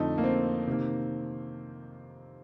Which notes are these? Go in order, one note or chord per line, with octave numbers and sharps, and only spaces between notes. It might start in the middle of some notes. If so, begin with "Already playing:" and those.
Already playing: F2 D3 A3 C4 D#4
A#3
C4
C3 D#3 A#3